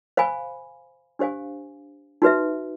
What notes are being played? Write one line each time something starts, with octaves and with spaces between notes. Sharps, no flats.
C5 F5 G#5 B5
D4 G4 C5 F5 G#5
D#4 F#4 B4 E5